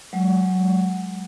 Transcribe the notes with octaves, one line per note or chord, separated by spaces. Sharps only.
F#3 G#3